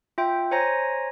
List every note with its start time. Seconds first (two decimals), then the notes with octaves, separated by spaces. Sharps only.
0.18 F4 E5 G5
0.51 C5 C#5 G#5 A#5 A#6